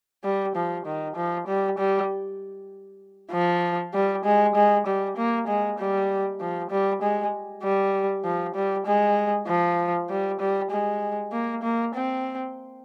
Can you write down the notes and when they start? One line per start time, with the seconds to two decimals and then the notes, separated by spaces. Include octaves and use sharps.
0.24 G3
0.55 F3
0.86 D#3
1.16 F3
1.47 G3
1.78 G3
3.32 F3
3.93 G3
4.24 G#3
4.55 G#3
4.86 G3
5.17 A#3
5.47 G#3
5.78 G3
6.40 F3
6.70 G3
7.02 G#3
7.63 G3
8.25 F3
8.55 G3
8.86 G#3
9.47 F3
10.10 G3
10.40 G3
10.71 G#3
11.32 A#3
11.63 A#3
11.94 C4